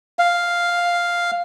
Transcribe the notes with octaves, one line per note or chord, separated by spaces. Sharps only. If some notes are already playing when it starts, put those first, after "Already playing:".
F5